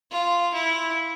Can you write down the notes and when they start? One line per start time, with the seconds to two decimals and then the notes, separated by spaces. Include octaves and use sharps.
0.11 F4
0.54 E4